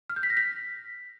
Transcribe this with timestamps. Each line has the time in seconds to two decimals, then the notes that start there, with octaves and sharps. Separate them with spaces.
0.10 F6
0.16 G6
0.23 B6
0.30 A#6
0.37 B6